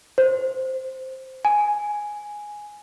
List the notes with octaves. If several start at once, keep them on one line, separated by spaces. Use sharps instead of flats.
C5
G#5